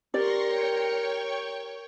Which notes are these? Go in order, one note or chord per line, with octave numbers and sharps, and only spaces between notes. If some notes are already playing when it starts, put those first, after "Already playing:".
G4 A#4 D5 C6 C#6 A#6
C#5 G5 C#6